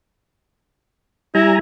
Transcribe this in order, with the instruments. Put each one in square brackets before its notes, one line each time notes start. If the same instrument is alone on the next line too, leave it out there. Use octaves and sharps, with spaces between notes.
[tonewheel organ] G3 G#5 A#5 [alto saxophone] E4